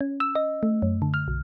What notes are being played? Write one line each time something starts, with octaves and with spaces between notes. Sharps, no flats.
C#4
E6
D#5
A3
F#2
D3
F6
B1